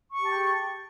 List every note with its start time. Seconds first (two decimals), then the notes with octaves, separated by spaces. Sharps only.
0.14 C#6
0.19 G4
0.24 A5
0.29 G5
0.34 G#4